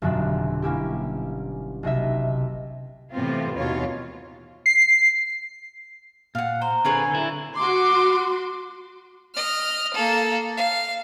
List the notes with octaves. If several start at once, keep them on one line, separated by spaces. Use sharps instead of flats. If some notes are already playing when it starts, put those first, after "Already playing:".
G1 F2 B2 F#3 D4 E5
A#3 C#4 E4 G4
B1 C3 D#5 E5
A2 C3 E3 B3 C4 F4
D#2 B2 E3 F4 C#5
C7
A#2 F5 F#5
C5 A#5
D3 C4 G#4 B4 C#5 G#5
D3 E4
F#4 C6 D6
D#5 F6
A#3 A4
F5